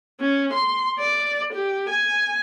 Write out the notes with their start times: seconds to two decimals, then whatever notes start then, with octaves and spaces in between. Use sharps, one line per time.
0.21 C#4
0.53 C6
0.99 D5
1.53 G4
1.89 G#5